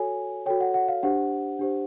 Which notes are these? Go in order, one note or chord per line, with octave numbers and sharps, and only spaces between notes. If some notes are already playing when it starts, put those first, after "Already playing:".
Already playing: F#4 A4 C#5 G#5
F#4 A4 C#5 G5
F#5
F#5
F5
D4 G4 C5 F#5
D4 G4 C5